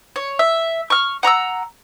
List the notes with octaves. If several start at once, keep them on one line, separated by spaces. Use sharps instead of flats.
C#5
E5
C#6 F6
F#5 A#5 C#6 E6